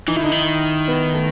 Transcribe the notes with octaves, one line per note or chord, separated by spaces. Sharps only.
E3 D#4
D#3 E4
D3 D#4
D#3
B3
A3